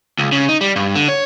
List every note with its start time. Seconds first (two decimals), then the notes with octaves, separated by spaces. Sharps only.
0.19 C#2
0.32 C#3
0.49 D#4
0.61 G3
0.76 G2
0.95 D3
1.08 C#5